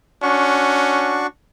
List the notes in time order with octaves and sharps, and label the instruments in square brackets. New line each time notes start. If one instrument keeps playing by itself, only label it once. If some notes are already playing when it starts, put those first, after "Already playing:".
[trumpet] C#4 [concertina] D4 F#4 C#6